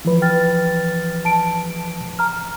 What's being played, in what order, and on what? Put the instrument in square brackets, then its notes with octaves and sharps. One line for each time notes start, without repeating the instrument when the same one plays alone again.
[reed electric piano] E3 F3 B4
[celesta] G5 F6 A6
A5 D7
A#5 F6